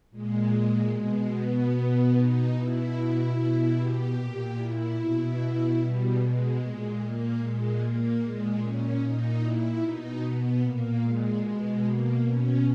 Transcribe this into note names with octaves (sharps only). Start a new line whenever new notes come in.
A#2 G#3
B2 G#3
B3
B2
D#4
B2 E4
B2
G4
A#2
E4
B2
B2 G3
G#3
A#2
A#3
A#2 G#3
A#3
A#2 G#3
C#4
A#2 D#4
E4
B2 D#4
B3
A#2 A#3
G#3
B2 G#3
A#3
B2 C#4